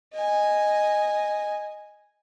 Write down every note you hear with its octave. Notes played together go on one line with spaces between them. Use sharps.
D#5 G#5